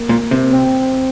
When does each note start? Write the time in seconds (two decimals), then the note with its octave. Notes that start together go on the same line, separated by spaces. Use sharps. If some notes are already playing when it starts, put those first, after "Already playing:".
Already playing: A#3
0.09 A#2
0.31 C3
0.52 C4